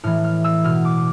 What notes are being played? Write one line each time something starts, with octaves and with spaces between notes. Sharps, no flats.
A2 E3 F6
F6
E6
B2 F6
D6